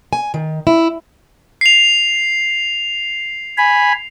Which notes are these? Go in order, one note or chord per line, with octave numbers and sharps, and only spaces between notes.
G#5
D#3
E4
C7 F7
G#5 B5